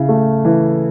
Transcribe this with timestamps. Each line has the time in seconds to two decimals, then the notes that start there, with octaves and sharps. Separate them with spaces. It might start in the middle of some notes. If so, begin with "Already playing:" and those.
Already playing: C#3 E4
0.09 A3
0.45 E3